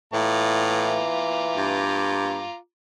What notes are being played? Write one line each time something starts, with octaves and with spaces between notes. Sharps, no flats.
A2 E3 F4 A#5 D6
G2